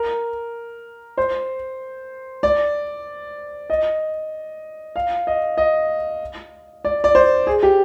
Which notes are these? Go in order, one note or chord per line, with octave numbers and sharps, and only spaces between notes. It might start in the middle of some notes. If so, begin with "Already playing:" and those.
Already playing: A#4
C5
D5
D#5
F5
D#5
D#5
D5
D5
C5
G#4
G4